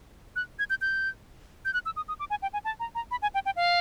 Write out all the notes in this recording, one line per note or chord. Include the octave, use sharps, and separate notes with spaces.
F#6
G#6
G6
G6
G6
F#6
E6
D#6
D#6
D6
G#5
G5
G#5
A5
A#5
A#5
B5
G#5
G5
G5
F5